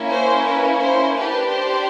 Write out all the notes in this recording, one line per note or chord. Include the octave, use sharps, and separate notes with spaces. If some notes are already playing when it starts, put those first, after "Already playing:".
Already playing: A#3 C#4 E4
C5
B4
C5
D4 G4 B4
C5